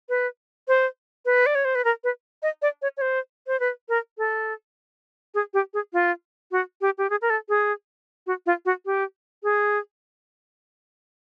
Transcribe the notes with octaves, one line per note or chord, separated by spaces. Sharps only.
B4
C5
B4
D5
C#5
C5
B4
A#4
B4
D#5
D5
C#5
C#5
C5
C5
B4
A#4
A4
G#4
G4
G#4
F4
F#4
G4
G4
G#4
A#4
A4
G#4
F#4
F4
F#4
G4
G#4